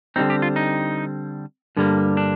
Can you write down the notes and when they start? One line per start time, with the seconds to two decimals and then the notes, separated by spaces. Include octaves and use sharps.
0.16 D3 G3 C4 D#4
0.30 G4
0.42 F4
0.56 D#4
1.76 G2 D3 G3 A#3
2.17 D4